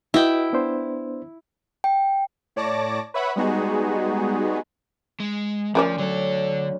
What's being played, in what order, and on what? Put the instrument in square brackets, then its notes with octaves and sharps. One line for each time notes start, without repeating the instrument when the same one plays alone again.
[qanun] E4 G5 [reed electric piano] F#4 B4 D#5
[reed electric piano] B3 D4 C5
[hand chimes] G5
[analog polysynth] A2 C#5 D5 A5 D6 A#6
B4 C#5 E5 F#5 B5
G3 G#3 B3 D#4 F#4 G#4
[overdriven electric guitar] G#3
[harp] D2 D5 [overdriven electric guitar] F3 [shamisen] C#4 A#4 C#5
[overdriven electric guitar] D3 A4 [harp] F#3